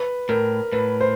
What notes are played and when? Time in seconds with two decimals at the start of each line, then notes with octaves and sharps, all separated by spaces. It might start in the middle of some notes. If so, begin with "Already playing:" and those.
Already playing: B4
0.29 A2 A#4
0.72 A2 B4
1.01 C5